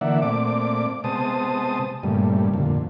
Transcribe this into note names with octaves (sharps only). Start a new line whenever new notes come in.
D3 E3 A#3 D5 E5 F#5
A#2 A3 C4 D5 D6
C3 G#3 B3 C5 A5 D#6
G2 A#2 C#3 G3 A3
F2 A#2 D3